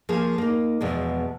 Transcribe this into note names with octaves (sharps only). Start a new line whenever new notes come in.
F3 A#3 G#4
A#3 D#4
E2 B2 F3 G#3